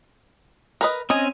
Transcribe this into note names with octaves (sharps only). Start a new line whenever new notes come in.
A#4 B4 D#5
C4 C#4 D#5 G#5